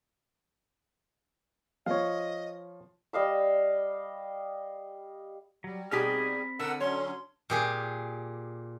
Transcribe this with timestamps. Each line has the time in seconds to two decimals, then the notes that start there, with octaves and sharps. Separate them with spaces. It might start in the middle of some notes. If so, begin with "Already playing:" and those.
1.86 F3 C#5 D#5 F5
3.13 G3 D#5 F5 E6
5.64 F#3 G3
5.91 B2 C4 D#4 G4 G#4 B5 F6
6.59 D3 A#4 F#5 E6
6.80 D3 F#3 C#4 C#5 C6
7.50 A#2 G4 G#4